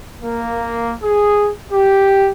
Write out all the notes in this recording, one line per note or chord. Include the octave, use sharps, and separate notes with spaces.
A#3
G#4
G4